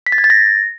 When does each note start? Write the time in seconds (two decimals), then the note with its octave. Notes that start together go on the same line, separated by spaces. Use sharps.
0.06 B6
0.12 A6
0.18 G#6
0.24 A6
0.30 A#6